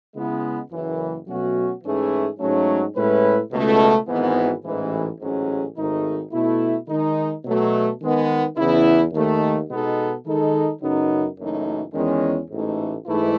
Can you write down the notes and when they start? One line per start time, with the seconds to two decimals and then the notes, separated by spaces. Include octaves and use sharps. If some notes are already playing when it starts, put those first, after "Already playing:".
0.14 C#3 G#3 B3 E4
0.71 F#1 F#2 E3
1.27 B2 F#3 A3 C#4 F#4
1.83 G#2 E3 A3 C#4 G#4
2.39 G#2 F#3 A3 C#4
2.95 A2 G#3 C#4 E4 B4
3.52 C#2 B2 A3
4.08 G#1 G#2 E3 B3
4.64 A1 G#2 E3
5.20 A1 G#2 F#3 C#4 G#4
5.76 G#1 G#2 D#3 A3 D#4
6.32 B2 A3 E4
6.88 D#3 G#3 D#4
7.45 B2 F#3 A3
8.00 D#3 G#3 B3
8.57 E2 C#3 E3 B3 E4
9.13 D#2 D#3 A3
9.69 B2 G#3 B3 D#4 A4
10.25 D#3 G#3 D#4 A4
10.81 F#2 C#3 F#3 B3 D#4
11.37 F#1 F#2 E3 A3 D#4
11.94 E2 D#3 G#3 C#4
12.49 A1 G#2 E3 A3 D#4
13.06 G#2 E3 A3 E4